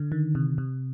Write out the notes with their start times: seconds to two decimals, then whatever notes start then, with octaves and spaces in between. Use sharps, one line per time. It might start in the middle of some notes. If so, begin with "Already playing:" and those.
Already playing: D3
0.12 D#3
0.35 C3
0.58 C3